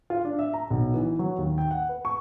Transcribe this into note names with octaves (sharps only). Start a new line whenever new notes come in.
F4
D4
E5
A#5
B1
E3
F#3
D#2
G5
F#5
B4
C#6